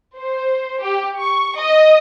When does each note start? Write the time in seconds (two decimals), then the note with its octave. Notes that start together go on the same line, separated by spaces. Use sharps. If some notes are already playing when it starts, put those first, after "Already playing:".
0.17 C5
0.82 G4
1.17 C#6
1.57 D#5